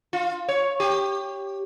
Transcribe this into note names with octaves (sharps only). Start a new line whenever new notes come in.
F4
C#5
G4